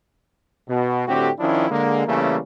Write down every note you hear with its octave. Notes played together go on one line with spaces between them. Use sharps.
B2
A2 D3 C4 F#4 G4
D#3 F3 C#4 D4 E4
D3 G#3 A#3
C#3 E3 G3 A3 A#3 C#4